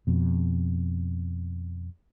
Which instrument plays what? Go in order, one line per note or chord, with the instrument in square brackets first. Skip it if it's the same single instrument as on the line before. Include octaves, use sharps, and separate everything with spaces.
[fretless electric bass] F2 B2